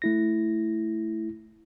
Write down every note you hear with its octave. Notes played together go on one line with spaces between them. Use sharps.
A3 E4 A#6